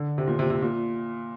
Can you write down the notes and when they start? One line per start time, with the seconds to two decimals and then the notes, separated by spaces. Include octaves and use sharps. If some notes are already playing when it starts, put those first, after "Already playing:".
Already playing: D3
0.18 C3
0.27 A#2
0.39 C3
0.50 C3
0.62 A#2